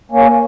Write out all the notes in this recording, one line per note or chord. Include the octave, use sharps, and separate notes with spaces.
A#3 C#4